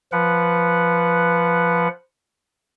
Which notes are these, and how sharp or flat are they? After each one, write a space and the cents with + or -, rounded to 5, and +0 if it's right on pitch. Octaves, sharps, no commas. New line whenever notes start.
F3 -10 B4 +0 F#5 +0